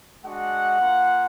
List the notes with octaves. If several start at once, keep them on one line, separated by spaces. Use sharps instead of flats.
G#3 D4 F#4 F#5
A#3 F4